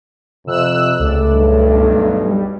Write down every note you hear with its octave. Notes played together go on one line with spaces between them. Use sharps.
F2 C3 E6 F#6
C#2 A3 D5
B1 G2
G3